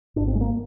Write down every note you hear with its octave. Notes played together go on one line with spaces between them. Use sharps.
G#1 G#2 D4
C4
G#3
A#3